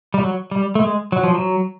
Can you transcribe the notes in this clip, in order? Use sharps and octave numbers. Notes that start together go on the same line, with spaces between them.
G3
F#3
G3
A3
G#3
F#3
F3
F#3